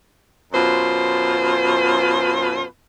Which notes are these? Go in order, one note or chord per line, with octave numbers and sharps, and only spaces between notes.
F#2 B2 F4 C5